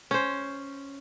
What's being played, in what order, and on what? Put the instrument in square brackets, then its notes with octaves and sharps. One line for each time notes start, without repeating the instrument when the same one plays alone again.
[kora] C#4 C5